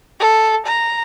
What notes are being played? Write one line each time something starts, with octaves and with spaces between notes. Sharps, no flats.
A4
A#5